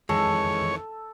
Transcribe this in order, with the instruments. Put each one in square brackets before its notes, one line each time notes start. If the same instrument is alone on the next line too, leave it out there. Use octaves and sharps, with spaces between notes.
[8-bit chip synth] F2 D#3 E3 [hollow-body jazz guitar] G#3 [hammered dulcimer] A4 [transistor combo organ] C#5